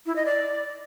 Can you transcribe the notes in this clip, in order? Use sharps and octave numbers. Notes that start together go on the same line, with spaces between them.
E4
D#5
D5